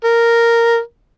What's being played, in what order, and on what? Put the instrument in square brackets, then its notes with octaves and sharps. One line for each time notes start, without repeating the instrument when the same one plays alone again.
[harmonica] A#4